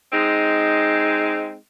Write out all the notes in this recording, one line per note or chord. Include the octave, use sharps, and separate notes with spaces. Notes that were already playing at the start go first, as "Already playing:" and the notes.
G#3 C4 D#4